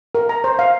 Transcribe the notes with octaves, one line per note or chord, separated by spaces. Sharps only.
A#4
A#5
C5
F5